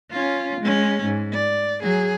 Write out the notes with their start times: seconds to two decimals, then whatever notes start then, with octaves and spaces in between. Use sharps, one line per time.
0.11 C#4 F4
0.61 G#3 C#4
1.05 G#2
1.33 D5
1.82 F#3 G#4